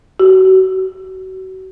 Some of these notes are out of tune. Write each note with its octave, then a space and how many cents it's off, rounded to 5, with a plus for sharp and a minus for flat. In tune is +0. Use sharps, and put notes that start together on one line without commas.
F#4 +30